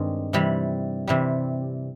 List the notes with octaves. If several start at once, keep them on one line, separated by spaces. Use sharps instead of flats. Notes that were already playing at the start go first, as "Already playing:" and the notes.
Already playing: G2 D#3 G#3 C4
C3 E3 G3
C3 E3 G3